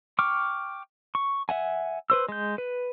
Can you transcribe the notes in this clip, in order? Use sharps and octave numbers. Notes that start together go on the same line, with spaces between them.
G5 C#6 D6 F6
C#6
E5 F#5 G#5
B4 C5 E6
G#3 G6
B4